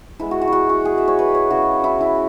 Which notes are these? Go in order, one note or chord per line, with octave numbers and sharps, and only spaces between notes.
E3 G#3 B3 E4
F#4
F#4
E4
F#4
F#4
G#4
E5
C#5
B4
C#5
C#3 E3 B3 F#4
E4
E4